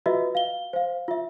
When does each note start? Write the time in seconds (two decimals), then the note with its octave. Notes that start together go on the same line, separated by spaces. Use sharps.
0.06 F4 F#4 B4 D#5 E5
0.35 F5 G7
0.73 C5 F5
1.08 F4 E5